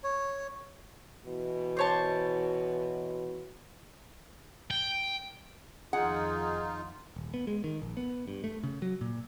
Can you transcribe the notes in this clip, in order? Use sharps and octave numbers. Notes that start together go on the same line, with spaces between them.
C#5
B2 E3
C5 C#5 A5
G5
F2 D#3 F3 D#4 F4 G#4 F#5
D#1
B3
G#3
D#3
A#1
B3
G2
A3
C#3
F#3
A#2